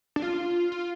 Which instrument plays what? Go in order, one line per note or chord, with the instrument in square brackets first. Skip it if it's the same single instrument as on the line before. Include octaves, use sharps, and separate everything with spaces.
[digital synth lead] D4
F4
F4